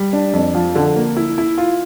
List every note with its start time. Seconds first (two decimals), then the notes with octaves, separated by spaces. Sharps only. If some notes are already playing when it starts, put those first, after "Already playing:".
Already playing: G3
0.13 D4
0.33 F2
0.55 F3
0.75 D3
0.96 A#3
1.17 E4
1.38 E4
1.58 F4